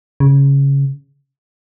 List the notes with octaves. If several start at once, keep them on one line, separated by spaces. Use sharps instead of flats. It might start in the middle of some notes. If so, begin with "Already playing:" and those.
C#3